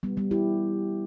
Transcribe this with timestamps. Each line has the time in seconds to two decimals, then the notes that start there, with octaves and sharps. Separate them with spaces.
0.03 G3 B3
0.17 G3 B3
0.31 E4 G4